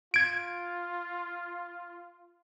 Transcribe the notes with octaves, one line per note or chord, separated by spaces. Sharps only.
F4 G#6 D7